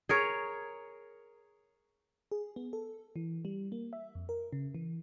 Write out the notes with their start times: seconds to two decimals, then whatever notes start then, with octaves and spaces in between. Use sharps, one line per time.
0.09 G#4 A#4 C#5
2.32 G#4
2.56 B3
2.73 A4
3.16 E3
3.45 G3
3.72 A#3
3.93 E5
4.15 F2
4.29 A#4
4.53 C#3
4.75 E3